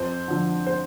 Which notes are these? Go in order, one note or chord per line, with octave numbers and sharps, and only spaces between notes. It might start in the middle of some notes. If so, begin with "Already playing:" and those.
Already playing: F2 C5
D3 F3
C5